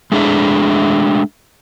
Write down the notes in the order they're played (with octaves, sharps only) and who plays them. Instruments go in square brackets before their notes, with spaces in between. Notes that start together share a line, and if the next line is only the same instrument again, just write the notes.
[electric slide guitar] G#3 A3 D4 G#4 E5